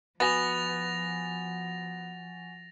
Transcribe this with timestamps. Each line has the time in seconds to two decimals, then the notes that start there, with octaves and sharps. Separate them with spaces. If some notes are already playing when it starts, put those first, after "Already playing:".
0.20 F3 B3 F#4 F#5 G#5 A6 A#6 F7